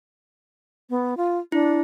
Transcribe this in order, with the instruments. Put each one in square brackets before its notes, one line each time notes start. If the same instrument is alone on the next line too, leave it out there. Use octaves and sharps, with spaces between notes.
[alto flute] B3
F4
[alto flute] D4 [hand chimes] E4